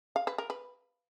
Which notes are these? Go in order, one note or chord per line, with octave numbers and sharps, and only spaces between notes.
F5
B4
A#4
B4